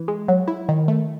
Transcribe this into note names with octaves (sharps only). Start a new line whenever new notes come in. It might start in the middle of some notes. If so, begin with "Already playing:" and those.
Already playing: E3
G#3
F#3
E4
D#3
A3